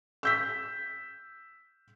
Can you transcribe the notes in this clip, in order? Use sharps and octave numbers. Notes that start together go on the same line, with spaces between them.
E6 G6 B6